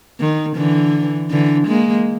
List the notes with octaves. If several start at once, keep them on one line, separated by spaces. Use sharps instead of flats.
D#3
D3 E3
D3 E3
G#3 A#3